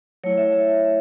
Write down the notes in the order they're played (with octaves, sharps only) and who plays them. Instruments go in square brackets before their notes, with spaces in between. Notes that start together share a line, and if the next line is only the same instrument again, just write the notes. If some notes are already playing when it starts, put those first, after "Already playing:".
[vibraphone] F#3 A3 E4 C#5
E5
E5